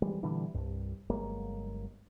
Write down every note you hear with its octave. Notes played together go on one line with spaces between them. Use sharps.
E3 G3 G#3
A#2 D3 E3 G3
C2 G2
G1 F#3 G#3 A#3